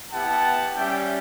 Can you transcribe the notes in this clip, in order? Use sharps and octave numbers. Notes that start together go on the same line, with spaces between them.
B3 E4 G4 F#5 A5
G3 C#4 G4 E5 G5